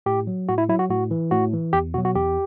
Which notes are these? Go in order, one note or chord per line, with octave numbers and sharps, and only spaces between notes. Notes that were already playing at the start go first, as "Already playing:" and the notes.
A2 G4
F#3
A2 F#4
E4
F#3 E4
F#4
A2 F#4
E3
A2 F#4
E3
E2 G4
B2 F#3 F#4
F#4
E2 G4